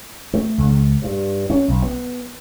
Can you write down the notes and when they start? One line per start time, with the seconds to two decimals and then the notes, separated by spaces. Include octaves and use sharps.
0.34 A3
0.58 C#2
1.02 G2
1.50 C#4
1.68 B1
1.82 B3